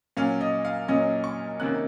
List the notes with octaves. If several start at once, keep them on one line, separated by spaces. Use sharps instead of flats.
A#2 F#3 C#4 F5
D#5
F5
A#2 F#3 C#4 D#5
C#6
C3 D#3 A#3 C#4 F#6